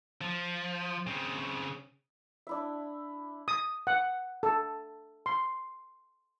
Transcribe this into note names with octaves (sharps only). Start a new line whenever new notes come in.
F3
C#3 C4
D4 E4 E5
D#6
F#5
A4
C6